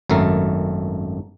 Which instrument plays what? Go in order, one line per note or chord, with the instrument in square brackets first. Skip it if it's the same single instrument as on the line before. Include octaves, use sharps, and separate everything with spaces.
[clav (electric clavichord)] G#1 F#2 A3 A#4